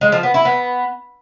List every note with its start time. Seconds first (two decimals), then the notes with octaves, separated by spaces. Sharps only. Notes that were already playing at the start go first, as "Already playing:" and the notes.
0.01 G#3
0.12 F3
0.23 B3
0.34 E4
0.45 B3